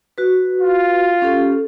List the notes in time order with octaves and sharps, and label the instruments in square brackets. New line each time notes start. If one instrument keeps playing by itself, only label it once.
[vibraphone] F#4 B4
[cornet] F4
[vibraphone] C#4 G4 A4